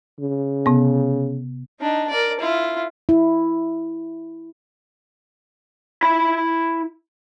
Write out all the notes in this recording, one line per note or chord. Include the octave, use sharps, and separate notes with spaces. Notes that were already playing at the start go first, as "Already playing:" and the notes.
C#3
C3 B3
D4 D#4
A#4 D5
E4 F4
E4
E4 B5